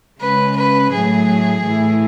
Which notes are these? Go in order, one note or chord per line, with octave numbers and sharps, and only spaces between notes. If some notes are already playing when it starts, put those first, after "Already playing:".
C#3 G#3 C#4 B4
B4
A2 F#3 A3 G#4
A2 E3 A3 E4